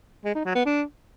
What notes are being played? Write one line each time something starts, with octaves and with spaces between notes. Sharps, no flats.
G#3
D#4
F#3
B3
D4